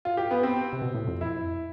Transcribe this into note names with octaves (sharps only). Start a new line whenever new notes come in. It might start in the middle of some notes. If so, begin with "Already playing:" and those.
F4
G4
B3
C4
C3
B2
A2
F2
E4